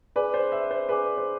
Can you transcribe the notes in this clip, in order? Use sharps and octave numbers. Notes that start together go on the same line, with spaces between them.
G#4 B4 D5 G#5 D6
C5
E5
C5
G#4 B4 D5 G#5 D6
C5